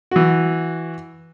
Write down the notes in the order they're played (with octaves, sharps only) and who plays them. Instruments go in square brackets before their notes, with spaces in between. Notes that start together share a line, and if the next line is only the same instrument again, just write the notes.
[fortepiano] E3 F#4